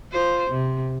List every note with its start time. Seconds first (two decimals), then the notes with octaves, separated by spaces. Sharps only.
0.12 F4 C5
0.50 C3